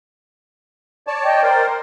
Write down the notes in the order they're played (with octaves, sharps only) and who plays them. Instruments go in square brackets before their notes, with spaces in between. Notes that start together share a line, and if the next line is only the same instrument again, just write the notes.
[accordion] C#5 D5 A5
[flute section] D#5 G5
[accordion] A#4 C5 [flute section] D5